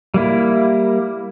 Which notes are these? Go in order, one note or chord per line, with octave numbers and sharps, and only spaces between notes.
G3 A#3 E4